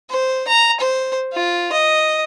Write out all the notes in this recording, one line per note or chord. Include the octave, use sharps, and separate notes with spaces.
C5
A#5
C5
F4
D#5